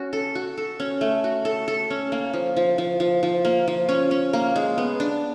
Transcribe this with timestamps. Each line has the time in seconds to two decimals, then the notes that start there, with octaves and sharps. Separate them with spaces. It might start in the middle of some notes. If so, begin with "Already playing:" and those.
Already playing: C#4 F#4
0.13 A4
0.35 F#4
0.58 A4
0.80 C#4
1.01 A3
1.24 F#4
1.45 A4
1.68 A4
1.90 C#4
2.12 A#3
2.34 F3
2.57 F3
2.78 F3
3.00 F3
3.23 F3
3.45 A#3
3.68 F3
3.89 C#4
4.11 C#4
4.33 A#3
4.56 G#3
4.78 B3
5.00 D4